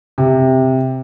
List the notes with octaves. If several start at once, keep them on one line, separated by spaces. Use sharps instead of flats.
C3